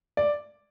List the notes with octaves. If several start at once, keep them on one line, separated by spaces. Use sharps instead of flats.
D5